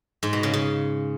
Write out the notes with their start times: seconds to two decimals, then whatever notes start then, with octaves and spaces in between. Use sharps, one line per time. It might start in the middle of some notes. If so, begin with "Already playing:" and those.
0.23 G#2
0.33 B2
0.43 C#3
0.53 C#3